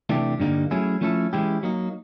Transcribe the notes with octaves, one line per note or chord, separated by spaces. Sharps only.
C3 E3 A3 D4 G4
G2 D3 G3 A#3 D#4
F#3 A3 C#4 E4 G#4
F3 A3 C#4 E4 A4
E3 G#3 C#4 E4 G4
F#3 A#3 D#4